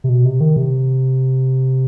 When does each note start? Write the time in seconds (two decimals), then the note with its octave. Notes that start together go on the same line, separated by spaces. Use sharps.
0.04 C3
0.09 B2
0.25 C3
0.41 D#3
0.56 C3